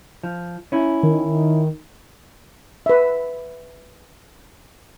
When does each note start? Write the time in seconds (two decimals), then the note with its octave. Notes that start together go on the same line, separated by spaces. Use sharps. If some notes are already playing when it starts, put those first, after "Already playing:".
0.23 F3
0.72 C#4 E4
1.03 D#3
2.86 B4 E5